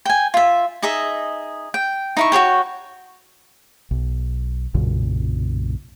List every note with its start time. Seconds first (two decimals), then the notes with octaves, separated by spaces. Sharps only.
0.05 G5 G#5
0.34 F4 E5
0.82 D#4 G#4 D#5 E5
1.74 G5
2.17 D#4 E4 C#6
2.32 F#4 G#4 C#5 G5
3.91 B1
4.75 B1 F#2 A#2 C#3